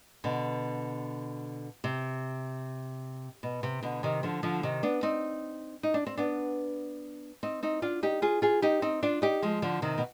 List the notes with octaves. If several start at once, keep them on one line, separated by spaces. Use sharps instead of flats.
B2 D3
C3
B2
C3
B2 D3
C3 D#3
D3 F3
D3 F3
C3 D#3
B3 D4
C4 D#4
D#4
D4
C4
B3 D4
C4 D#4
C4 D#4
D4 F4
D#4 G4
F4 G#4
F4 G#4
D#4 G4
C4 D#4
D4 F4
D#4 G4
F3 G#3
D3 F3
C3 D#3
B2